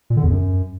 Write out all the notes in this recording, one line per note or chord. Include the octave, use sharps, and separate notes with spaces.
A#2
D3
E2
F#2